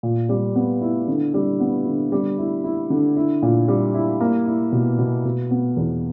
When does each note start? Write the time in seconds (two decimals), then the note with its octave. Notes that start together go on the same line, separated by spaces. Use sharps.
0.03 A#2
0.29 G3
0.55 B3
0.81 E4
1.08 D3
1.34 G3
1.60 B3
1.86 D3
2.12 G3
2.38 E4
2.64 E4
2.90 D3
3.16 E4
3.42 A#2
3.68 G3
3.94 E4
4.20 A#3
4.47 E4
4.72 B2
4.99 B2
5.25 B2
5.51 B3
5.77 E2